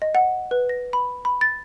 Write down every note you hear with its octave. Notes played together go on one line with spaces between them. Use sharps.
D#5
F#5
B4
A#6
B5
B5
A6